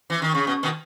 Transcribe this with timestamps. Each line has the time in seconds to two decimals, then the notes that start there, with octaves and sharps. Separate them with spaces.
0.10 E3
0.22 D#3
0.35 C#3
0.47 B2
0.63 B2 D#3